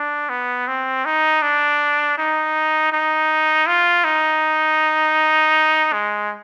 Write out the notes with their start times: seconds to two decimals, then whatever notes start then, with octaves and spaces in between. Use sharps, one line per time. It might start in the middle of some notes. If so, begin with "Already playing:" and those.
Already playing: D4
0.29 B3
0.68 C4
1.05 D#4
1.42 D4
2.18 D#4
2.92 D#4
3.67 F4
4.04 D#4
5.93 G#3